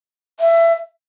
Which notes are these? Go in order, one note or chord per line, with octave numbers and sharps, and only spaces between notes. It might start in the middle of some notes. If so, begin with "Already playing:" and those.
E5